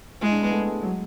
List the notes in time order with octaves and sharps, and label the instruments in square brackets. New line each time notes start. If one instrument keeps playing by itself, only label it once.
[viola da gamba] G#3 [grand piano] E4
[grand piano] D4
B3
A3
G#3
F#3